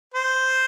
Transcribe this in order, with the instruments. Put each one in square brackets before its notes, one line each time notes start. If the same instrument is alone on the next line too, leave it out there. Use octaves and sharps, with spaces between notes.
[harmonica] C5